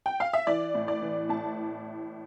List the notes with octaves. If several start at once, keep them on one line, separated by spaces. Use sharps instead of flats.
G5
F5
E5
E3 D5
A2
D5
E3
A2 A5